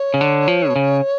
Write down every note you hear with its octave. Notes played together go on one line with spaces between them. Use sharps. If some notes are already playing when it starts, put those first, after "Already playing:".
Already playing: C#5
C#3
D3
F3
B2
C#3